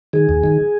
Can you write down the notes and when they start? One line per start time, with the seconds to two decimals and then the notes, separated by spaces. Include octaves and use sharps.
0.13 D#3 G#4
0.29 D#2
0.44 D#3